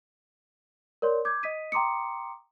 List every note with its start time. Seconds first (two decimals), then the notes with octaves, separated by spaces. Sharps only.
1.02 A#4 C#5 D5 C6
1.25 D6 G6 G#6
1.43 D#5 D#6 B6 D#7
1.72 G5 A#5 C6 D6 D#6 C#7